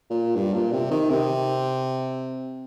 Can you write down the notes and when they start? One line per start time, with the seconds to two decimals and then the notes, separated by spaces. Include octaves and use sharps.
0.10 A#2
0.35 G2
0.54 A#2
0.72 C3
0.91 D#3
1.10 C3